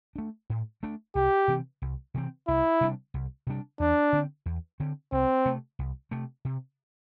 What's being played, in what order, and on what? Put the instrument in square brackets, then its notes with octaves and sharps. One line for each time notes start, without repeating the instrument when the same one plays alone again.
[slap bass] A3 D4
A2
A3 D4
[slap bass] C2 [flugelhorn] G4
[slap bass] C3 E3 C4
C2
C3 E3 C4
[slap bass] C2 [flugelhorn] E4
[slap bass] C3 G3 D4
C2
C3 G3 D4
[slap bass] E2 [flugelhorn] D4
[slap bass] D3 C4
E2
D3 C4
[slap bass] C2 [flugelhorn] C4
[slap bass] C3 A3
C2
C3 A3
C3